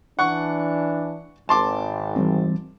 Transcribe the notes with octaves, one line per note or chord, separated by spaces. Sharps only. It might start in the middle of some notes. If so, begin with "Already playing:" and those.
E3 D4 F#5 C#6
G#1 A5 C6 D6
E3 G3 C4